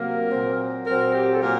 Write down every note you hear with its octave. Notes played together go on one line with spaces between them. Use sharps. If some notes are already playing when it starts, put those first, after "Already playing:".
Already playing: C3 F#3 A#3 A#4
A#2 F#3 C4
A#2 F#3 C4 A#4
G4
A4
A#2 F#3 A#3 A#4